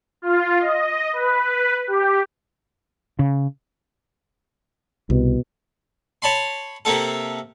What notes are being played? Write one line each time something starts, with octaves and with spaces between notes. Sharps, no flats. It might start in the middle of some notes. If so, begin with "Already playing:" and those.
F4
D#5
B4
G4
C#3
C2 B2
C#5 A5 B5 C6
C3 A#3 C4 A4